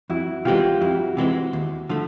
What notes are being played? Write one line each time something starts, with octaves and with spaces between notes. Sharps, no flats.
F2 E4 F#4
C3 E3 G#3 C4 F4 G4
F2 E4 F#4
C3 E3 G#3 C4
D#2
D3 F3 A3